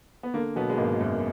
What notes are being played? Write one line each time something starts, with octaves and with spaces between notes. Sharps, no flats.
B3
D3 A#3
B2 F#3 B3
G#3
G#1 A#3
F#2